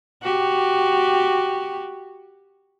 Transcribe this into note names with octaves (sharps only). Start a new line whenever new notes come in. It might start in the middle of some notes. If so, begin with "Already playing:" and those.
F#4 G4